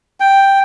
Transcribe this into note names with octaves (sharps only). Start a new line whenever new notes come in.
G5